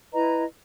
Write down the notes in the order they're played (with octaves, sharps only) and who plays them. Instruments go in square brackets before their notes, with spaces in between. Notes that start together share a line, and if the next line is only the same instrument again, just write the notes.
[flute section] E4 B4 D#5 A#5